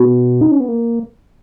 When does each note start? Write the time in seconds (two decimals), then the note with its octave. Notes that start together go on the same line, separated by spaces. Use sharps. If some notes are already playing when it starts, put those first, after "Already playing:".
Already playing: B2
0.41 D#4
0.51 C#4
0.60 B3
0.68 A#3